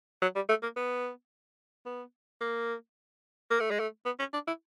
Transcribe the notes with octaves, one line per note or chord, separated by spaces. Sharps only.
F#3
G3
A3
A#3
B3
B3
A#3
A#3
A3
G#3
A3
B3
C#4
D4
E4